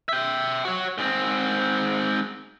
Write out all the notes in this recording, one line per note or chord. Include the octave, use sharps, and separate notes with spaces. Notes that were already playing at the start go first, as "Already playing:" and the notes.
E5 G5
F#4 C#5
G#2 C4